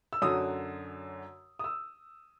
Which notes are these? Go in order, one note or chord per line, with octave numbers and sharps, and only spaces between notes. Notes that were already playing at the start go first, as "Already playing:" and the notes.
E6
F#2 D3 F#3 D#6
D#6
E6